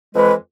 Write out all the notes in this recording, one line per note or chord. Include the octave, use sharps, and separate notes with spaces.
F2 E3 G#3 B4